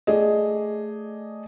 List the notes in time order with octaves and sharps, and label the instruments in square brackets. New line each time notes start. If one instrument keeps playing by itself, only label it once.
[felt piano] A3 G#4 D5 D#5